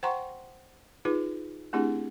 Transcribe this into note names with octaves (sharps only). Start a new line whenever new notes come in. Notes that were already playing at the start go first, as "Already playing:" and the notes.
C5 F#5 G5 A#5 C6 C#6
D#4 F4 G#4 B4
A3 C4 D4 E4 G4 G#4